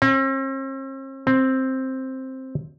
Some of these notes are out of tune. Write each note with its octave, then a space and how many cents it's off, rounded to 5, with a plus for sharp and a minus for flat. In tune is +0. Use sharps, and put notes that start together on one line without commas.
C4 +45
C4 +5